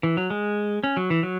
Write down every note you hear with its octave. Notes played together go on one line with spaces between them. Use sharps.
E3
F#3
G#3
C#4
F#3
E3
F#3